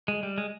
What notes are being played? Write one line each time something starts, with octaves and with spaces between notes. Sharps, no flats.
G#3
G3
G#3